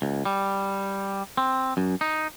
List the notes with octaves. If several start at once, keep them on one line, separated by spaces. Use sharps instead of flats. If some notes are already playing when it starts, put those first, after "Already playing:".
C#2
G3
C4
F#2
D#4